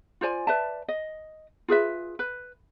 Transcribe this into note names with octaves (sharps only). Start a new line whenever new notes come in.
F4 C5 D5 G#5
B4 D5 E5 A5
D#5
F4 G#4 B4 E5
B4